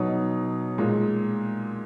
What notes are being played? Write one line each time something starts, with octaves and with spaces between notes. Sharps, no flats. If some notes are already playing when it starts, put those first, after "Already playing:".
Already playing: B2 F#3 D#4
A#2 G#3